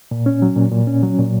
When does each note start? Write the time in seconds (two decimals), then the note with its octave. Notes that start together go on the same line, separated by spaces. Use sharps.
0.11 A#2
0.26 C#4
0.42 F#3
0.56 A#2
0.72 A#2
0.87 C#4
1.03 F#3
1.18 A#2